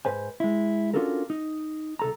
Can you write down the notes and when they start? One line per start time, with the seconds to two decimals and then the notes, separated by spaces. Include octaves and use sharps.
0.05 G#2 B4 C5 G#5
0.40 G#3 E4
0.94 C#4 D4 F4 F#4 A4 A#4
1.30 D#4
1.99 C2 A4 A#5